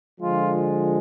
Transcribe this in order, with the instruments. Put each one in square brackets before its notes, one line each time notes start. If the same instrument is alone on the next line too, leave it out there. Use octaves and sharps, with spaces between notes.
[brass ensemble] D3 F3 G#3 F4